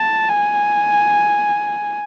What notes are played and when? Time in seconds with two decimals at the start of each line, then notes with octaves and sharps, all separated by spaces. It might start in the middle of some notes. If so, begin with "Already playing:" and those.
Already playing: A5
0.29 G#5